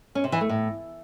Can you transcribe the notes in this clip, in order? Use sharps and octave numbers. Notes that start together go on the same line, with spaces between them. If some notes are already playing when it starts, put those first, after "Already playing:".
C#4
C3
E3
A3
A2